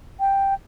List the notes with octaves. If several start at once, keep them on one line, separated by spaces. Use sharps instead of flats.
G5